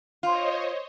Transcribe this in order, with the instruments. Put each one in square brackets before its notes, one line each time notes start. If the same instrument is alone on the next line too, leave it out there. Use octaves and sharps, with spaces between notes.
[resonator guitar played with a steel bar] F4 [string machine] C5 C#5 D#5